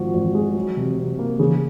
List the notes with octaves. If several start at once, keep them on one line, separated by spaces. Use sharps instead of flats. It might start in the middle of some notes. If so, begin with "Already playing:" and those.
Already playing: G#1 F3 F#4
G#1
G#3
F#3
C3
C3
A#3
C#3 G#4